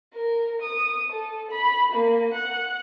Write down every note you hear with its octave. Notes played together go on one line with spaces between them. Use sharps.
A#4
D#6
A4
B5
A#3
F#5